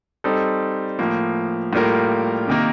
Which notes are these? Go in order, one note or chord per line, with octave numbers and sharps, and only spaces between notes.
G3 C4 D#4 A4
A2 F3 A#3
A2 G3 A#3 F4 A#4
C3 D#3 A#3